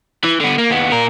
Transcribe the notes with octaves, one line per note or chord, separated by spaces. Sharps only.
E3
D3 B3
A#3
D#2 B3
A#2 A#4